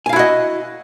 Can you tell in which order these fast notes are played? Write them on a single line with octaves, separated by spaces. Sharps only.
G#5 F5 E4 F#4 D#5